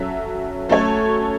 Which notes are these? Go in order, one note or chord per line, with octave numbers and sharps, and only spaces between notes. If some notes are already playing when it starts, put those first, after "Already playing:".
Already playing: F#3 C#4 A4 E5
F#3 A3 C#4 A4 C#5